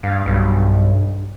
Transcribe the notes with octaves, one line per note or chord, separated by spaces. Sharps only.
G2 F5
B1 G2